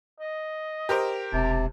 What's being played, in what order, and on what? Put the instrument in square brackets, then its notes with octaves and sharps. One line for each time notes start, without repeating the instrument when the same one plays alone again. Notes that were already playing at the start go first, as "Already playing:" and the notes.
[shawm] D#5
[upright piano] G4 A#4 C5
[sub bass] E1 [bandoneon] C3 [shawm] A5